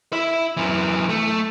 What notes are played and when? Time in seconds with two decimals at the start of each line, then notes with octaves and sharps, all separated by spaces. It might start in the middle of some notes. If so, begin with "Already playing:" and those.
0.13 E4 E5
0.57 F#2 E3
1.09 A3